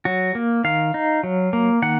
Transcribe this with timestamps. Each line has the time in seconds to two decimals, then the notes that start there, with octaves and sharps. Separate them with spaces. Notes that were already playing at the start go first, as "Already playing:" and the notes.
0.05 F#3 F#4
0.35 A#3
0.64 D#3 F5
0.94 D#4
1.23 F#3
1.53 A#3
1.82 D#3 F#5